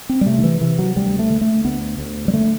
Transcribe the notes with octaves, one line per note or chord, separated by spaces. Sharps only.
C4
G3
C3 A3
D3
E3
C3 E3
F#3
D2 G3
A3
D3
A3
D2 B3
D2
G3
D3 A3